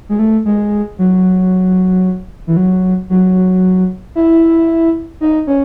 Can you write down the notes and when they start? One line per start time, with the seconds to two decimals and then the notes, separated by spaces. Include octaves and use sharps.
0.09 G#3
0.19 A3
0.45 G#3
0.99 F#3
2.47 E3
2.57 F#3
3.10 F#3
4.15 E4
5.21 D#4
5.47 C#4